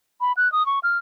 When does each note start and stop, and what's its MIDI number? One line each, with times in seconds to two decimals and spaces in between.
0.21 0.32 83
0.37 0.51 90
0.52 0.65 87
0.66 0.79 85
0.83 0.98 89